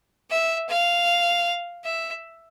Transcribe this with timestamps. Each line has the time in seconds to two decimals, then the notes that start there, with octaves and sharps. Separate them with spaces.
0.30 E5
0.69 F5
1.84 E5